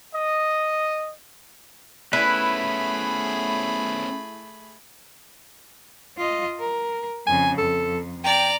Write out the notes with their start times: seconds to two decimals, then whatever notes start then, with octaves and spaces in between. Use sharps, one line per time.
0.13 D#5
2.13 A3 B3 C#4 E4 G#4 B4 B5
6.17 F4 D#5
6.60 A#4
7.27 F2 C#3 G#5
7.58 F2 A4
8.24 D5 G5 A#5